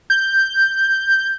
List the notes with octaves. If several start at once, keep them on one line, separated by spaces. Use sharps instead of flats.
G6